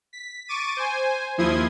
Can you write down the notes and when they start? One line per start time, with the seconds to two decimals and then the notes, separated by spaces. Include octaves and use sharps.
0.13 B6
0.48 C#6 D6 A6 D#7
0.77 C5 G#5
1.38 D#2 F3 E4 C6 D#6 G#6